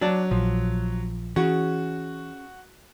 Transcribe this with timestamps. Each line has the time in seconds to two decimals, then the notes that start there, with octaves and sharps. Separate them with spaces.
0.01 F#3 D4 D5
0.31 A#1 F3
1.36 E3 C#4 F#4 G#4